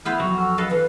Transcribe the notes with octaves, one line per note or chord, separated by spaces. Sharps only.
B3 E4 B4 C5 F6
F2 F#3 F#4
F#4 A4 F6
A4 B4 D#5 F5
E3 B4 F5